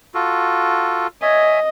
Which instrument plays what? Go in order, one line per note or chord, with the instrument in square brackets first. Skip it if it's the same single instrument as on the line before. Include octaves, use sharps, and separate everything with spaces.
[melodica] F4 F#4 A4
[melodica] C#5 E5 G#5 [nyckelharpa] D#5